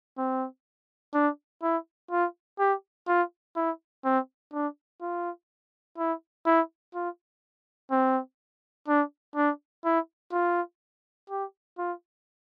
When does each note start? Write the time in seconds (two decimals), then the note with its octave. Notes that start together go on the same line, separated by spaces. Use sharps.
0.18 C4
1.14 D4
1.63 E4
2.11 F4
2.59 G4
3.08 F4
3.56 E4
4.05 C4
4.53 D4
5.01 F4
5.98 E4
6.46 E4
6.95 F4
7.91 C4
8.88 D4
9.36 D4
9.85 E4
10.32 F4
11.30 G4
11.78 F4